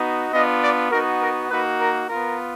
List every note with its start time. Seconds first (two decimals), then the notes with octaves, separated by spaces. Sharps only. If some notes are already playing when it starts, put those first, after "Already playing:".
Already playing: B3 D#4 F#4
0.32 B3 D4 F4 D#5
0.62 D5
0.91 B3 D#4 F#4 A#4
1.21 A#4
1.50 A#3 D#4 F#4 B4
1.80 A#4
2.09 B3 F4 A#4